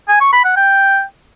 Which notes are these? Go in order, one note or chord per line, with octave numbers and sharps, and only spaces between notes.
G#5
C#6
B5
F#5
G5